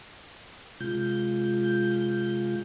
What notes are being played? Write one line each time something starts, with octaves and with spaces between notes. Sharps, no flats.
C3 G#3 F4 G6